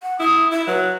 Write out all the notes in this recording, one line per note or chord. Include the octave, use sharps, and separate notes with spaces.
F#5
E4 D#6
E4 E5
F#3 B4